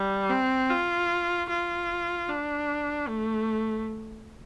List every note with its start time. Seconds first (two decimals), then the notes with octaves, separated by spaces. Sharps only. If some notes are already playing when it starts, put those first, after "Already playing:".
Already playing: G3
0.30 C4
0.69 F4
1.49 F4
2.28 D4
3.08 A3